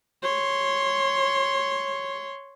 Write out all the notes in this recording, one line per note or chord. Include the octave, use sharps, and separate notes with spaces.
C#5 C6